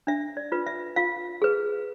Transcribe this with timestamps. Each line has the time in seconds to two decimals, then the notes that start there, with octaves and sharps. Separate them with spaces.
0.07 D4 E5
0.37 D5
0.52 F4 B4
0.67 E5
0.96 F4 F5
1.42 G#4 B4